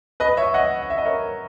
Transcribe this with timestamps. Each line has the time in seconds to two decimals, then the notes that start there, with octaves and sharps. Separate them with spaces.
0.20 B4 D#5
0.37 C#5 E5
0.54 D#5 F#5
0.82 F#5
0.90 E5
0.98 D#5
1.05 A#4 C#5